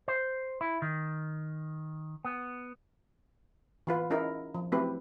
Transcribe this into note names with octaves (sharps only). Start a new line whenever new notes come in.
C5
E4
D#3
B3
E3 F4 B4
C#4 D#4 E4 A#4
F3
F#3 A3 C4 E4 G4 B4